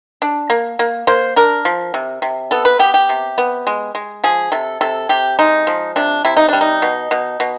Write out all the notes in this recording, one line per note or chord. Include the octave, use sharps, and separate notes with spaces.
D4
A#3
A#3
A#3 C5
D4 A#4
F3
C3
C3
B3 A4
B4
B3 G4
G4
C3
B3
G#3
G#3
F3 G#4
C3 A4
C3 A4
C3 G4
G#3 D#4
F3
C3 D4
C3 E4
D#4
G3 D4
D#4
B2
B2
B2